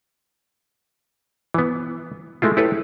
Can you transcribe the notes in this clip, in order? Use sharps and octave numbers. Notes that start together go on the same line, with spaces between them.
E3 B3
G#3 A3 E4 F4
E4 G4 A4 B4 C#5